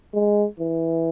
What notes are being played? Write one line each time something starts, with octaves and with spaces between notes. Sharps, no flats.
G#3
E3